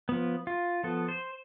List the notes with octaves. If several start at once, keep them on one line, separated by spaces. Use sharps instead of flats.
F3 B3
F4
F3 B3 A4
C5